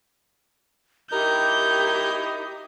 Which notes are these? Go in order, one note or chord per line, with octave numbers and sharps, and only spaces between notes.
D#4 E4 G4 A#4 D#5 G6